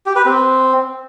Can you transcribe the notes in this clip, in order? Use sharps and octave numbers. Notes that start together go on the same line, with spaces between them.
G4
B4
C4